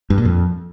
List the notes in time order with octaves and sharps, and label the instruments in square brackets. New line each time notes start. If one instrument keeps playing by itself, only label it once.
[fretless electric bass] G2
A#2
F2